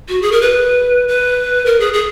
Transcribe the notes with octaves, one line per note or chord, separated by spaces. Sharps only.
F#4
G#4
A#4
B4
B4
A#4
G#4
G#4